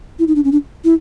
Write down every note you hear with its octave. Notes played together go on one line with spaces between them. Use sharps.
E4
D#4
D4
C#4
D4
E4